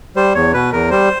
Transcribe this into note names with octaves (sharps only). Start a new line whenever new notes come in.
G3 C5
E2 C#5
B2 B4
E2 A#4
G3 C5